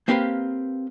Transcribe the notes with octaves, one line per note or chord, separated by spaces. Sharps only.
A#3 C4 G4 B4 F5